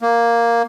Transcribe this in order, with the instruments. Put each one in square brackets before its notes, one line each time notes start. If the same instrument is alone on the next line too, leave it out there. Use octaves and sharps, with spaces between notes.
[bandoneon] A#3